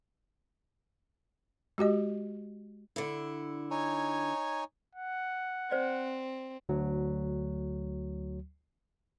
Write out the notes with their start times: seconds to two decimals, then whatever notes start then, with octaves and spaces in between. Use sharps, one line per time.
1.78 G#3 F#4 G4 D#5
2.96 D3 E4
3.71 D#4 C#5 G#5
4.96 F#5
5.71 C4 C5 D5
6.69 D2 F#3